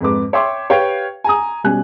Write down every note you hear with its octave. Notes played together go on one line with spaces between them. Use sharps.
F2 G#2 B4 D6
C#5 E5 G5 C6 D6
G4 B4 C#5 F5 G5
G#5 A#5 D#6
B2 G3 C#4 G#5 F#6